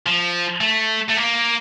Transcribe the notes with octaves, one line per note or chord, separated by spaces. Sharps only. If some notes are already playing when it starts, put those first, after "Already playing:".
F3
A3
A3
A#3